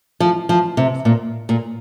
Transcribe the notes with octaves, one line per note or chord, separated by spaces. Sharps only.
F3
F3
C3
A#2
A#2